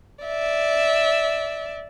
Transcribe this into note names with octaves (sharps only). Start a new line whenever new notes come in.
D5 E5